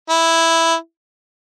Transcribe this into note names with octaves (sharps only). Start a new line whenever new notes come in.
E4